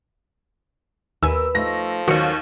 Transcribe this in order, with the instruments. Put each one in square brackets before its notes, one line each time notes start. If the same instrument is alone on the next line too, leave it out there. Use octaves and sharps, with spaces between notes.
[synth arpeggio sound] D#2 G#5 [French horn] A#4 [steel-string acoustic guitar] B4 [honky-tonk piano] E6
[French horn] F3 [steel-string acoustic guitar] A3 D#4 [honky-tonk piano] A#6
[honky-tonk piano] D#2 D#3 [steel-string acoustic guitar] F#3 C#4 [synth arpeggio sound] F#4 C#7